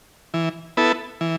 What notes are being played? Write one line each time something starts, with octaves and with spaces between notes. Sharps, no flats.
E3
B3 E4 A4
E3